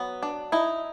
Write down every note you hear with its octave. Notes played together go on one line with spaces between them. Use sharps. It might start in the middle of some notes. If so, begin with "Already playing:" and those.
Already playing: F#3 B3
D4
D#4 E4